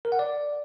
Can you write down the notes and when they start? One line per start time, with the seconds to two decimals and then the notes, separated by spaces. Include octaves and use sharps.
0.05 A#4
0.12 F#5
0.19 D5